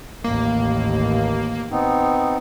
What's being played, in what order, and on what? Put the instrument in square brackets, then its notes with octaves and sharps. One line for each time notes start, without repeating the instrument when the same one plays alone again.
[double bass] A1 D#2 [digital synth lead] A#3
[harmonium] B3 C4 D#4